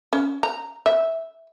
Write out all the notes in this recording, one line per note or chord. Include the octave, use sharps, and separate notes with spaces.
C#4
A#5
E5